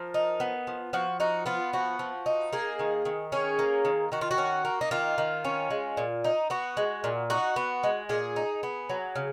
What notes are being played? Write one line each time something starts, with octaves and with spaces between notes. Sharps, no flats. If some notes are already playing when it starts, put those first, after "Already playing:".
Already playing: F3 A#4
D#4
B3
F3
F3 F#4
D#4 F#4
B3 F4
F3 F#4
F3
D#4
A#3 G#4
D#3
D#3
C#4 G#4
A#3
D#3
D#3 F#4
F4
F#4
C#4
A#3
D#4
D#3 F4
D#3
C#4
G#3
A#2
D#4
B3 F#4
G#3
A#2
D#4 F#4
B3
G#3
A#2 G#4
D#4
B3
F#3
C#3